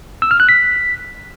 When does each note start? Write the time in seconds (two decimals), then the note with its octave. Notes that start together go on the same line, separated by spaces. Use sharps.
0.22 E6
0.31 F6
0.40 F#6
0.49 B6